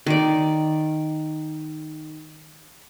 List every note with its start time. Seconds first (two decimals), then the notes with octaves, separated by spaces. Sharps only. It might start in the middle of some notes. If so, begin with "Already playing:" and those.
0.06 D#3 D5